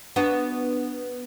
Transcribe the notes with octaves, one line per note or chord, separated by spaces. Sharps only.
B3 D4 F#4